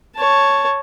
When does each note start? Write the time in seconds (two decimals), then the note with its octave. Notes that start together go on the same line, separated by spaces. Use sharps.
0.16 C#5 A5